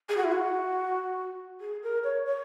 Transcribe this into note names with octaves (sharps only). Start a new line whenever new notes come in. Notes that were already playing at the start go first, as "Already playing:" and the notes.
G#4
F#4
E4
F#4
G#4
A#4
C#5
C#5